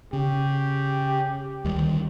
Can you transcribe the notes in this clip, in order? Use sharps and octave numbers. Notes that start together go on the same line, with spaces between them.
C#3 G4
D2 D#3 G3